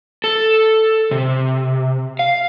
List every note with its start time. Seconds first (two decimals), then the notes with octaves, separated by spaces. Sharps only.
0.24 A4
1.11 C3
2.19 F5